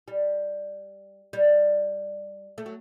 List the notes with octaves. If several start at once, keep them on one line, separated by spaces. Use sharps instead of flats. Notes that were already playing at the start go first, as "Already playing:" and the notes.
G3
G3
A3
F#3